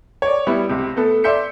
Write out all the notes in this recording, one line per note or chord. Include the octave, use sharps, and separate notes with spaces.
C#5 D5
G3 B3 E4
C#2 C3
A3 B3 A4
D5 E5 C6 G6 B6 C#7